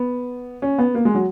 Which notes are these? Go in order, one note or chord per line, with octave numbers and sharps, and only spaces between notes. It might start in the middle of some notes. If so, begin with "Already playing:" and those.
Already playing: B3
C#4
B3
A#3
G#3
F#3